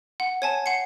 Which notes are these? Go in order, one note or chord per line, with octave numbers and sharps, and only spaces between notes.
F#5
C#5 G#5 A5
F#5 C7 C#7